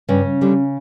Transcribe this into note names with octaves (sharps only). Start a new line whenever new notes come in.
G2 C#3 C#4
D3 G3